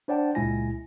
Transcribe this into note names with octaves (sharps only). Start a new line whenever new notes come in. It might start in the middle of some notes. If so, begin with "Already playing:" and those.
D4 C5 D5 F#5 G5 A5
C#2 A#2 G#3 E4 G#5 A#6